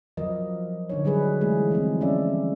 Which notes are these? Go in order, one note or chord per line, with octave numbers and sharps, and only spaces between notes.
F3 F#3 A#4 D#5
D3 D#4 C#5
F#3 G3 G#4 B4
E3 G#3 A3 G#4
E3 F3 A3 C4
F3 G3 C#4 A4 D5 E5